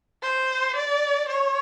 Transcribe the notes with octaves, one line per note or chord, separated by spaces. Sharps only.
C5
D5
C#5